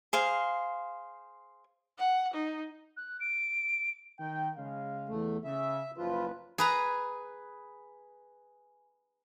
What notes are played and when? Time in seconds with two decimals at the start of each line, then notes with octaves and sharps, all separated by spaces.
0.13 G#4 C5 F5
1.98 F#5
2.34 D#4
2.97 F#6
3.20 D7
4.18 D#3 G5
4.56 C#3 G#3 F5
5.09 E2 A3
5.44 C#3 E5
5.98 F#1 F3 F4 B4
6.58 G#4 B4 A#5